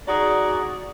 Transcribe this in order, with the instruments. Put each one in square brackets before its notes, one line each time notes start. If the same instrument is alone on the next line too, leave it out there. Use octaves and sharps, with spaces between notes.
[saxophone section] D#4 F#4 G#4 D5